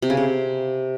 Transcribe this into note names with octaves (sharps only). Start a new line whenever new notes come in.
C3
C#3
C3